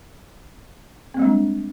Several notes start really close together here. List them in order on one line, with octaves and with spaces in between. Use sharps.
C4 A#3 G3 G#3 D4